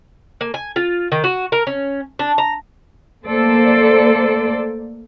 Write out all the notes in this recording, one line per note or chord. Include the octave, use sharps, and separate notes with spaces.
A#3
G#5
F4
D#3
F#4
A#4
C#4
D4
A#5
A3 A#3 A4 C5 D5